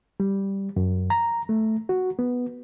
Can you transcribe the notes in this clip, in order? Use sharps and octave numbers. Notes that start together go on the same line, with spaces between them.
G3
F#2
A#5
A3
F#4
B3